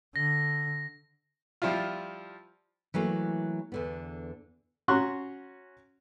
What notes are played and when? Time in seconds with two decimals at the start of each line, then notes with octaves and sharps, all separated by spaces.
0.16 D3 A#6
1.62 F3 G3 E4 F4
2.94 E3 F#3 A3 A#3
3.72 E2 D3 B3
4.88 C#4 F#4 A#5 C6 C#6 F#6